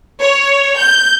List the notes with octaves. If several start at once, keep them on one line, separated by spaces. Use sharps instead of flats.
C#5
G6